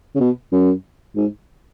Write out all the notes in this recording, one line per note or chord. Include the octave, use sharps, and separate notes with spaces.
C#3
B2
F#2
G#2